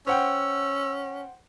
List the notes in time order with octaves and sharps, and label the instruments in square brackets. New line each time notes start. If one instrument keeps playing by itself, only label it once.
[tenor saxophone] C#4 [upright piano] C5 F#5 G5 [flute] E6